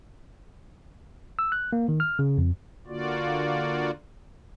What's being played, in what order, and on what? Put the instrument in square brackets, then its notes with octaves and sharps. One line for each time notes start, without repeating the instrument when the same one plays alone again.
[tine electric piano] E6
F#6
A#3
D#3
F6
C#3
F2
[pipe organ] D3 A#3 F4 F#4 D5